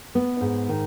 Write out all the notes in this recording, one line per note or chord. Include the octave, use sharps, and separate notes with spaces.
B3
G#2
D#3